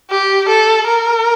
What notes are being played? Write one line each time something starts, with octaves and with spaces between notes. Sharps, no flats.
G4
A4
A#4